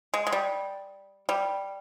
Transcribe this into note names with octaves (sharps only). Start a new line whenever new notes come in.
G#3
G#3
G3
G3